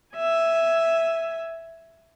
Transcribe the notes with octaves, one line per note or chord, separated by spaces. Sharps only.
E5 G#5